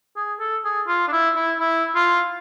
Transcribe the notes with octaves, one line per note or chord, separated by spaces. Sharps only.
G#4
A4
G#4
F4
D4
E4
E4
E4
F4